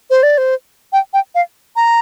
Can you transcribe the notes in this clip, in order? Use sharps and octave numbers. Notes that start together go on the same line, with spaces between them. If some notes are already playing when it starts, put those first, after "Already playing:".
C5
D5
C5
G5
G5
F5
A#5